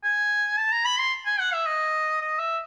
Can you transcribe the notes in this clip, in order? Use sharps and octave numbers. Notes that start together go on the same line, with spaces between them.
G#5
A5
A#5
B5
C6
G#5
F#5
E5
D#5
D#5
E5